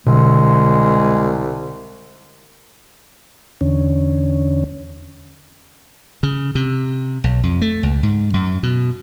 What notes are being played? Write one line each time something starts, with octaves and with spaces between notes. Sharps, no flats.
C2 B2 D3 G#3
E2 D3 C#4
C#3
C3
B1
F2
A3
C#2
G#2
F#2
B2